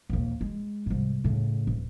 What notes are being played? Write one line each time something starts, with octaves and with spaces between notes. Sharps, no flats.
A#1 D#2
G#3
C2 G#2
A2 C#3
D1